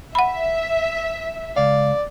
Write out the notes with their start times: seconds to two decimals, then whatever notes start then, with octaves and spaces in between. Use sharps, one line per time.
0.15 E5 F#5 B5
1.56 C#2 D5 F5